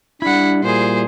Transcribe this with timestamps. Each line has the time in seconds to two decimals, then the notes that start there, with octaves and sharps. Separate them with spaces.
0.22 G3 D4 E4 F#5 B5
0.64 A#2 G#4 C5